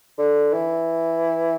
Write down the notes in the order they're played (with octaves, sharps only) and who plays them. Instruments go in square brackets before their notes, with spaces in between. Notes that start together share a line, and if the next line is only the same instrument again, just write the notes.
[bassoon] D3
E3